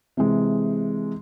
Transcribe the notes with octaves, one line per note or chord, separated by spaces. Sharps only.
C3 E3 G#3